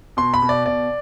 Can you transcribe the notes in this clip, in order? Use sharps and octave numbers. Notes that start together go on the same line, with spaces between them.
B2 C6
B5
B2
D5
B2 D5